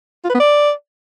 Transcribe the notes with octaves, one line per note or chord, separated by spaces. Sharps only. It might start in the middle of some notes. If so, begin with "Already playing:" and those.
F4
B4
B3
D5